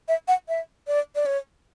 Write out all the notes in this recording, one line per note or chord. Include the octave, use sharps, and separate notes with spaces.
E5
F#5
E5
D5
D5
C#5